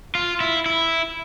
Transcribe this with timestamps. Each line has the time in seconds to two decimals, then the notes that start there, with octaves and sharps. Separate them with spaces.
0.15 F4
0.40 E4
0.66 E4